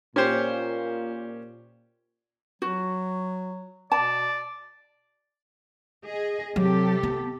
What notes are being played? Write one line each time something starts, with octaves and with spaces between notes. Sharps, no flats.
A#2 C#4 G4 C5
F#3 F#4
B2 D5 A5
G#4 D#5
C3 F#3 G4 A4
B3